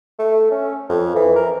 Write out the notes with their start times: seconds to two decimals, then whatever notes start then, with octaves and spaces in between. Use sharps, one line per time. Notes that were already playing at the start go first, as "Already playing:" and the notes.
0.19 A3
0.51 C#4
0.89 F2
1.16 E3
1.36 A#4